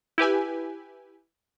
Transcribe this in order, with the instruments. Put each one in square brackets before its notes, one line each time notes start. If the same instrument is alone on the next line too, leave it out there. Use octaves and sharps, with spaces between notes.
[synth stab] E4 G4 B4 G#5